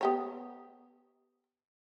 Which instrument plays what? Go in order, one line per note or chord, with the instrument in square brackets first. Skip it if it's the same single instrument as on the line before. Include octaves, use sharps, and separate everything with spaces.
[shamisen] B3 G4 C#5